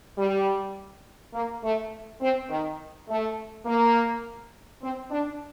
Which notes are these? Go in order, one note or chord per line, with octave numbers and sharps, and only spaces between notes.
G3
A#3
A3
C4
D#3
A3
A#3
C4
D4